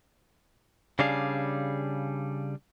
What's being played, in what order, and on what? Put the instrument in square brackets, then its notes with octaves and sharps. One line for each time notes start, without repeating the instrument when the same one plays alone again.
[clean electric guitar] C#3 G3 D4 G#4 F5